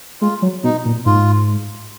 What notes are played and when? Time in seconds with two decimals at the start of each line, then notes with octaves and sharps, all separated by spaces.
0.21 G#3 F4
0.42 F#3
0.64 B2 D#4
0.85 A#2
1.06 G#2 F4